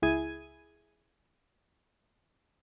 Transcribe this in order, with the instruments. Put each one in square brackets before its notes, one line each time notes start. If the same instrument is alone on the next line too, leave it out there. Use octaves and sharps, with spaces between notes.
[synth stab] C#2 E4 G#4 G#6 D#7